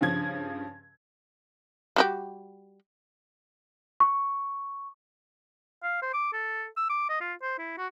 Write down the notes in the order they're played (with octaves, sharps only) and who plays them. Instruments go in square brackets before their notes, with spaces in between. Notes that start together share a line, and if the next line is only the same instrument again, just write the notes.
[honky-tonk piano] G2 C#3 F3 G#6
[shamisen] G3 F#4 G4
[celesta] C#6
[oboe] F5
C5
D6
A4
E6
D6
D#5
F4
C5
E4
F#4